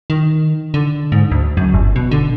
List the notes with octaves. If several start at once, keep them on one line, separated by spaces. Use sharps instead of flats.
D#3
D3
G#2
D2
F#2
G1
B2
D3